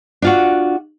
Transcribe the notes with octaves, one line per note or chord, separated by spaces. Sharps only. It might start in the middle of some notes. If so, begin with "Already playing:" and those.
D4 F4 F#4